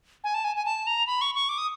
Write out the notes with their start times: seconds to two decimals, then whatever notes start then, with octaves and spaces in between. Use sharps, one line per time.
0.24 G#5
0.34 A5
0.44 G#5
0.56 G#5
0.65 A5
0.87 A#5
1.07 B5
1.21 C#6
1.35 C#6
1.49 D6
1.58 D#6